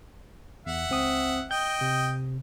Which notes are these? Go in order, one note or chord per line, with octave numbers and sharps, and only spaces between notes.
E2 E5 F#5
C#2 C4 D#6
D#5 G5 G6
C3